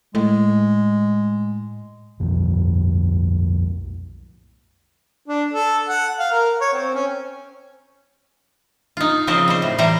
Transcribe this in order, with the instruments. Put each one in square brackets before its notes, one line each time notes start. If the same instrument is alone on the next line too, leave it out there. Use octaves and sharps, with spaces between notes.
[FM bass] A2 [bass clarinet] G#3
[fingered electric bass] B1 F2
[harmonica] D4
A4
F#5
F5
A#4
C#5
C4
C#4
[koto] D#4 F4
C#3 F3 C4 A#4 C5 D#5
G3 C5
A2
A2 E3 G3 C5 A#5